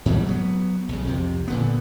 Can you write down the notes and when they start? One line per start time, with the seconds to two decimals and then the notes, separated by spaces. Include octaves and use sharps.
0.06 G#2 B2 F#3 G3
0.27 F#3 A3 B3
0.89 B1 C#3
1.05 C2 F2 C3
1.48 A#2 D3 B3